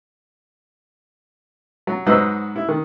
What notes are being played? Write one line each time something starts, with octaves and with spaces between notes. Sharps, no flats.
F#3
G#2 F#3 B4 C5 D#5 E6
E4
D#3